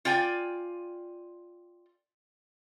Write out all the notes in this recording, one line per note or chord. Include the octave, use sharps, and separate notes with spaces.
F4 D5 G5 G#5